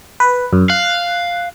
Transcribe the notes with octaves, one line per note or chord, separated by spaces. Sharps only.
B4
F#2
F5 F#6